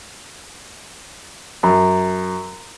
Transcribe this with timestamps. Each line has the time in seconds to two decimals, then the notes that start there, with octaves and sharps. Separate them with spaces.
1.63 F#2